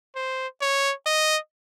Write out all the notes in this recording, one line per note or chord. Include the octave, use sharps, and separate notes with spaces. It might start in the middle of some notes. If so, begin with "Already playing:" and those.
C5
C#5
D#5